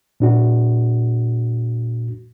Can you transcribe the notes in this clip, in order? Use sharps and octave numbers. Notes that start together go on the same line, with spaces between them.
A#2 D4 F#4